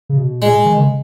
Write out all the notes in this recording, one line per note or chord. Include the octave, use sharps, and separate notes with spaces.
C#3
B2
A#2 G#3
D#3
C#3